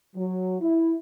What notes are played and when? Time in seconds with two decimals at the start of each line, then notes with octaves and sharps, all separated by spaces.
0.16 F#3
0.61 E4